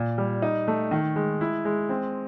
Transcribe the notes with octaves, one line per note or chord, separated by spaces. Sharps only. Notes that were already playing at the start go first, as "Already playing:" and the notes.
Already playing: A#2
G3
D#4
A3
D#3
G#3
E4
G#3
C4